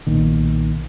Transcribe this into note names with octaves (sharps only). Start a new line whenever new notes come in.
B1 A#2 D#3